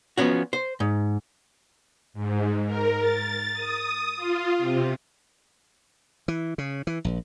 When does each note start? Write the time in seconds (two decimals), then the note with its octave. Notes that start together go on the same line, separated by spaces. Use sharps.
0.17 F3 B3 C#4 F#4
0.53 C5
0.80 G#2
2.14 G#2
2.66 A#4
2.99 A6
3.53 D#6
4.17 F4
4.59 C3
6.28 E3
6.58 C#3
6.87 E3
7.05 A#1